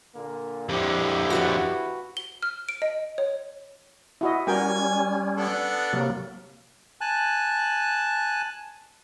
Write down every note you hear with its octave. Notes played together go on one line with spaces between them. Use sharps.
A#2 D3 A#3
F2 D3 E4 G4
F#4 B4 A5
G7
F6
D7
D#5
C#5
E4 F#4 D#5
G3 C#4 F#4 A#4 G5 G#5
B3 D4 A4
C3 F#3 A#3
G#5 A5 F#6